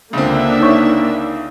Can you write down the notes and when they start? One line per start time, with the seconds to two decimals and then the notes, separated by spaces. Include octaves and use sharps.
0.13 C#2 D3 A#3 C4 D4 E5
0.60 D#4 C#5 C#6